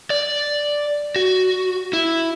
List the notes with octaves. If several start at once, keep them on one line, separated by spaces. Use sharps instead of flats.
D5
F#4
E4